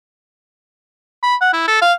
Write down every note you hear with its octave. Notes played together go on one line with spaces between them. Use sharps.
B5
F#5
E4
A4
F5